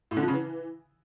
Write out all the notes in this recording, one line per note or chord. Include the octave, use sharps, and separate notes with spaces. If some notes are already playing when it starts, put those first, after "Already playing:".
A2
D3
F3
C#3
E3